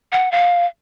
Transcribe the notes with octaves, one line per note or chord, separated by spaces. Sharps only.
F#5
F5